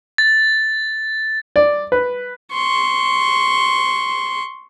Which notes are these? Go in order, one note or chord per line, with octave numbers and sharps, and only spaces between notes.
A6
D5
B4
C6 C#6